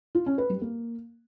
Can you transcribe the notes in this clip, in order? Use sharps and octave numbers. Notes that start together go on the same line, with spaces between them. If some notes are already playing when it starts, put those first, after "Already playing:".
F4
C#4
B4
G3
A#3